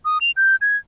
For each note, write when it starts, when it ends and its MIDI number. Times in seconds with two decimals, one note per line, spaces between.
0.05 0.18 87
0.21 0.31 101
0.37 0.56 91
0.61 0.76 92